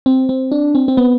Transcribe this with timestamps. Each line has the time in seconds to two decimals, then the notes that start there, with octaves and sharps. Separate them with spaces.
0.06 C4
0.29 C4
0.52 D4
0.75 C4
0.88 C4
0.97 B3